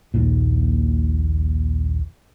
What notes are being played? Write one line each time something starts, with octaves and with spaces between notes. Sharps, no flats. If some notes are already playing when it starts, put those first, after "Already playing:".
A#1 D#2 A#2